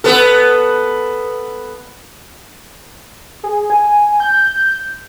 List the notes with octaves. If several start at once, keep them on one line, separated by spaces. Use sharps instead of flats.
B3 A4
G#4
G#5
G6